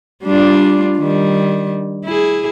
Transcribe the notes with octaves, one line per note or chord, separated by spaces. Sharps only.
G3 D4 F4
D#3 G3
E4 G#4